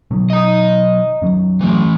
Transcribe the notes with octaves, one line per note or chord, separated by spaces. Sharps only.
B2 D#3 F#3
D#5 A#5
F#2 D#3 F#3
E3 A3